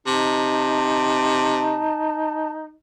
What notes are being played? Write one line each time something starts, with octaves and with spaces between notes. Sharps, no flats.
C3 D#4 A5